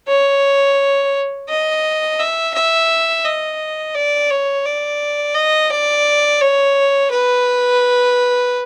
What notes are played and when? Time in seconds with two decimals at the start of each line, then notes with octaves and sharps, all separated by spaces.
0.08 C#5
1.49 D#5
2.19 E5
2.54 E5
3.24 D#5
3.95 D5
4.30 C#5
4.65 D5
5.35 D#5
5.70 D5
6.41 C#5
7.11 B4